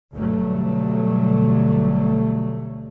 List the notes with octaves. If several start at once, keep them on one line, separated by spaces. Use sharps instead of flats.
G1 D2 B2 F#3 G3 A3